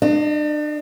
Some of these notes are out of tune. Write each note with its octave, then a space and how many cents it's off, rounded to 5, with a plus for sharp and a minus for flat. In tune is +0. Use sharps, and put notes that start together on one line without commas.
D4 +35 D#5 +0